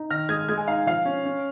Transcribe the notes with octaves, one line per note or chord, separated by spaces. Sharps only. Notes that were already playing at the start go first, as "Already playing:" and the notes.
Already playing: D#4
D#3 F6 A#6
G#3 D#6 G#6
G#3 D#6 G#6
G#5
D#4 F5
F3 F5
C#4
C#4